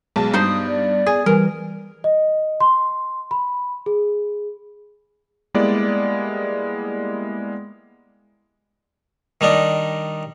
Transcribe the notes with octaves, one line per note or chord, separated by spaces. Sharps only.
B1 G#3 B3 A5
G2 D#4 C5 D#6
D5
G#4 G#5
E3 G3 A#4
D#5
C6
B5
G#4
G3 G#3 A#3 B3 E4 D5
D#3 G3 D4 D#4